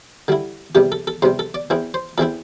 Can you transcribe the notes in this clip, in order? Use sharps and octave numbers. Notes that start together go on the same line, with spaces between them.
D3 G3 E4
E2 C3 G3 G4
A4
A4
E2 C3 G3 C5
A4
D5
E2 E3 C4 E4
C5
E2 E3 C4 E4 A4